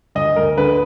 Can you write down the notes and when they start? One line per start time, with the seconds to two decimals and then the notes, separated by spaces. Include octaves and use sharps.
0.15 D2 D#5
0.36 D2 A#4
0.58 D3 B4